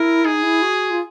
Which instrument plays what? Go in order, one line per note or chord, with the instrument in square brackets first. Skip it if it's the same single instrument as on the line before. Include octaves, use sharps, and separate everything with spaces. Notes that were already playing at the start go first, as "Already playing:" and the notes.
Already playing: [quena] E4 [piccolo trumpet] A#4
[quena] D#4 [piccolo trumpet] G#4
[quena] E4
F#4
F4